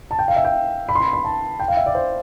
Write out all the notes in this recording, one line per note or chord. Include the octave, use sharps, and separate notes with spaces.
A5
G5
F5
E5
G5
B5
C6
B5
B5
A5
G5
F5
E5
D5
C5